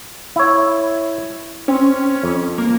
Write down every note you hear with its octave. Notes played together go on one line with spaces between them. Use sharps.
E4 C#5
C4 C#4
F2
A#3